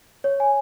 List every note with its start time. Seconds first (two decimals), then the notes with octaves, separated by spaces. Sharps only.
0.24 C#5
0.40 G#5